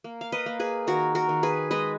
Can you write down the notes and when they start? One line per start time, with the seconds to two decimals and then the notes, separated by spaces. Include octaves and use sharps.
0.04 A#3
0.21 F5
0.32 B4 D#5
0.46 A#3
0.60 G#4 B4
0.87 D#3 F#4 A#4
1.15 F#4 A#4
1.29 D#3
1.43 G#4 B4
1.71 G#3 B4 D#5